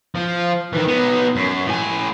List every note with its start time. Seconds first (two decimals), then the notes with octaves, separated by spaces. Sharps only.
0.15 F3
0.73 D#3 E3
0.88 B3 D#4
1.36 F#2
1.65 A2 G#5